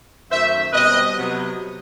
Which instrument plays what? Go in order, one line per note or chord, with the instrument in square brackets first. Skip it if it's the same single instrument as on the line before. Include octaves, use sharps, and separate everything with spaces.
[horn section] F#2 D#3 A3 C5 E5
B2 G3 C4 B4 D#5
C3 F#3 B3